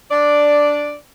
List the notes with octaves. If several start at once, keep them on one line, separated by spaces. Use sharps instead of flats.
D4 D5